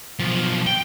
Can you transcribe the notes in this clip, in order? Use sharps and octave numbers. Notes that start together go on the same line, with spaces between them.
B1 F3
G5